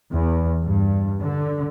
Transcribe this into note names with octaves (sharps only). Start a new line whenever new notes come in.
E2
G2
D3